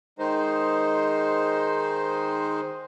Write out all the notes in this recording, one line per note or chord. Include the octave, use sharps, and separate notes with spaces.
D#3 G#3 D#4 C5